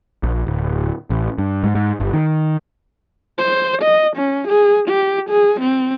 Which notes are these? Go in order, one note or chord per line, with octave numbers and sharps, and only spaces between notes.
A#1
D1
A1
G2
G#2
G#2
G1
D#3
C5
D#5
C#4
G#4
G4
G#4
C4